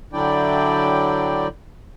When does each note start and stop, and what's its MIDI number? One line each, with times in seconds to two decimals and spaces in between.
0.13 1.47 50
0.13 1.47 54
0.13 1.47 62
0.13 1.47 64
0.13 1.47 74
0.13 1.47 79